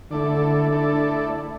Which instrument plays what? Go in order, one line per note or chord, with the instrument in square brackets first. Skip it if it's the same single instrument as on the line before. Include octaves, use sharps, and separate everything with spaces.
[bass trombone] D3 [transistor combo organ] A3 E4 A4 D5
[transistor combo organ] A3 E4 A4 D5